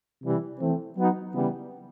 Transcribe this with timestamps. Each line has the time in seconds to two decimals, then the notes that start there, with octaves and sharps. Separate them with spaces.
0.22 C3 E3 G3
0.59 E3 A3 C4
0.97 F#3 B3 D#4 F#4
1.33 C#3 E3 G3 B3